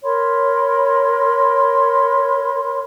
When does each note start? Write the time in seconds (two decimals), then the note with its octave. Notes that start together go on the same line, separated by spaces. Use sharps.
0.04 A#4 C#5 B5 C6